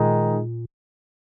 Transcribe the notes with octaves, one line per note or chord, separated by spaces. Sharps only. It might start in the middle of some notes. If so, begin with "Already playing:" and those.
Already playing: A#2 D#3 G#3 D#4